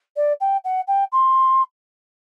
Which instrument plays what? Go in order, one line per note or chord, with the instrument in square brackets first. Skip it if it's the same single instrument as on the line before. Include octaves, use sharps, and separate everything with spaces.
[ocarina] D5
G5
F#5
G5
C6